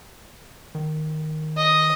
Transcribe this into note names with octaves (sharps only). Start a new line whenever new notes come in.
D#3
D#5